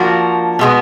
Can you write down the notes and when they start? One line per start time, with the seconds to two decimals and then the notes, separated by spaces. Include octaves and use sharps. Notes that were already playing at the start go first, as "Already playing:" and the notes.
Already playing: F3 A#3 D4 F#4
0.59 B2 G#3 B3